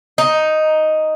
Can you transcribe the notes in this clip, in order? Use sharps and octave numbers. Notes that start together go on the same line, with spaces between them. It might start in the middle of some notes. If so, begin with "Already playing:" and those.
D#4